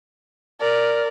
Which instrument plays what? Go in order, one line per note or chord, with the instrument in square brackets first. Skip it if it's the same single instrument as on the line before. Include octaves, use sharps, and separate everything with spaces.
[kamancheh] A#4 [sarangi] D5